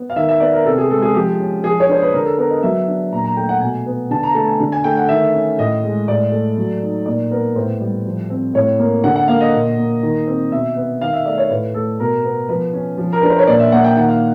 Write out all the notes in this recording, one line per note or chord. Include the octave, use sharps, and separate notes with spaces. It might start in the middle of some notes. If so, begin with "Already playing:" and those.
Already playing: B3
F5
D#3 E5
E5
B3 D5
A#4
C3 A4
G#4
G#3 A4
G#4
F3 G4
C#4
F3 G#4
C#5
D4 C5
B4
D3 A#4
A4
B3 A#4
D#5
F#3 E5
D4
A#2 A#5
A#5
A3 G5
F#5
B2 G#5
B3
D3 A5
A#5
A3 A5
G#5
D3
G#5
A3 G5
F#5
D#3 E5
C#4
A2 D#5
G#3
A2 D5
A3
F#3
D#4
A#2 D5
B3 A#4
A2 C5
G3
F3
C4
A2 C#5
A#3
D3 F#5
F#5
A#3 F5
D#5
A#2
A#3
D#3
C4
B2 E5
B3
D#3 F5
E5
A3 D5
C#5
A2 B4
A3 A4
B2 A#4
B3
F3 B4
C#4
F3
A#4
D4 B4
C5
C#5
A#2 D5
E5
A#3 F#5
G5
D#3 F#5
F5